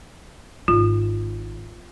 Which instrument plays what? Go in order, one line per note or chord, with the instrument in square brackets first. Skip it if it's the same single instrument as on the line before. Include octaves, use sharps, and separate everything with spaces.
[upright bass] G#1 [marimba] F4